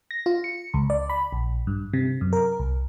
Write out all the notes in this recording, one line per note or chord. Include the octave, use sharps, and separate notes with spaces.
A#6
F4
C#7
C#2
D5
B5
A#1
G2
C3
F#2
A#4
C2